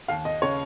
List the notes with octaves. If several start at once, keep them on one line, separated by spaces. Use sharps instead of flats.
D#2 F5
D#5
C#3 C#5